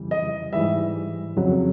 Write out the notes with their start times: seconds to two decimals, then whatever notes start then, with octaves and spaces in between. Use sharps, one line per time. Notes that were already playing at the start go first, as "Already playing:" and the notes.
Already playing: F2 C#3 E3 G3
0.11 D#5
0.53 G#2 E3 G3 E5
1.37 F2 C#3 F#3